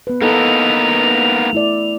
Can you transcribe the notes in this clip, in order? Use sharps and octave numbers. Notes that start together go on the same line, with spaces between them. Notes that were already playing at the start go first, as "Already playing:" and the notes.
B3 B4
A#3 B3 D#4 E4 A4 F7
A3 E4 D5